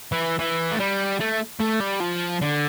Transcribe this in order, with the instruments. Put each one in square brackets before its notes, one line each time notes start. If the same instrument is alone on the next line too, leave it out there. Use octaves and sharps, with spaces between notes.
[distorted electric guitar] E3
E3
A3
G3
A3
A3
G3
F3
D3